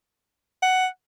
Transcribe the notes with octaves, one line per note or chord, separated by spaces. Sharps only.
F#5